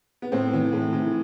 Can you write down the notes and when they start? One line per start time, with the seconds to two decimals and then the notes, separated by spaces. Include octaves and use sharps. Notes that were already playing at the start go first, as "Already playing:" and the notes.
0.22 B3
0.32 A2 C4
0.53 E3
0.72 A2
0.93 E3